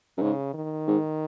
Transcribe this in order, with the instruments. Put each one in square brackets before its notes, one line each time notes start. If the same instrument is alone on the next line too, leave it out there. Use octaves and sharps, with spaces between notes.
[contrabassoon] F#2
[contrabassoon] G#2 [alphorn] C#3
[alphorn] D#3
[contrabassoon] G#2